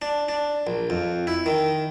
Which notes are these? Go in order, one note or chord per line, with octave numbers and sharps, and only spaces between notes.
D4
D4
A#1
F2
E4
D#3